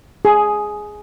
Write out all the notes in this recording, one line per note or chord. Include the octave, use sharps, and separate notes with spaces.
G#4